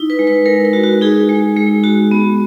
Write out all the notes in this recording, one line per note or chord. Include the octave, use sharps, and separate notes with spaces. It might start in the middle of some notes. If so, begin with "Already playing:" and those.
Already playing: D#4 E4
B4
G#3
B4
G#3 A#4
A#4
F#4
F#4
D#4 G#4
G#3
G#3
F#4
B3